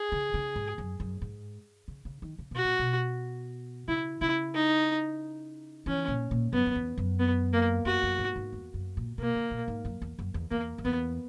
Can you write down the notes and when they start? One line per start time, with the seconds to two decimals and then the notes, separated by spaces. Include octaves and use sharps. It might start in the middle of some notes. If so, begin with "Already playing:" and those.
Already playing: G#4
0.12 C#3
0.34 C#3
0.56 G#2
0.78 F#2
1.00 F#2
1.22 G#2
1.88 C#3
2.05 C#3
2.22 D#3
2.39 C#3
2.51 B2 F#4
2.64 A#2
2.79 B2
3.88 C#3 E4
4.21 C#3 E4
4.54 D#4
5.86 E3 C#4
6.08 A#2
6.31 A#2
6.53 F#2 B3
6.66 F#2
6.75 E2
6.98 F#2
7.19 B3
7.53 A#3
7.85 F#2 F#4
8.03 F#2
8.18 G#2
8.36 G#2
8.53 E2
8.74 F#2
8.97 A#2
9.18 B2 A#3
9.35 C#3
9.51 A#2
9.68 G#2
9.85 F#2
10.02 E2
10.19 F#2
10.34 E2
10.51 E2 A#3
10.78 F#2
10.85 E2 B3